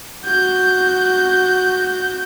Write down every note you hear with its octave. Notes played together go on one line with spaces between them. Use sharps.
F#4 G6